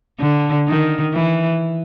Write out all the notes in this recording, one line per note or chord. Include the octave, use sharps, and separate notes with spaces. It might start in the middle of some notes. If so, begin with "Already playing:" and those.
D3
D#3
E3